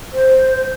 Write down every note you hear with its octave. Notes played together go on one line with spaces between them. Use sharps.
C5